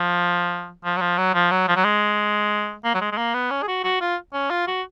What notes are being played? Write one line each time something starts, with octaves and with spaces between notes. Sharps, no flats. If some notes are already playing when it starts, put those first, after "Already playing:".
Already playing: F3
F3
F#3
F3
F#3
F3
F#3
F3
F#3
G#3
A#3
F#3
G#3
G#3
A#3
B3
C#4
G#4
F#4
F#4
F4
C#4
F4
F#4